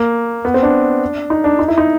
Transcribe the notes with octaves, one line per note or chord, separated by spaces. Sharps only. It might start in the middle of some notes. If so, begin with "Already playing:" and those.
Already playing: A#3
B3
C4
D4
D#4
D4
D#4
E4
D#4